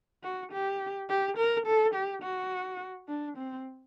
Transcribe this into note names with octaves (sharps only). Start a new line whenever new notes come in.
F#4
G4
G4
A#4
A4
G4
F#4
D4
C4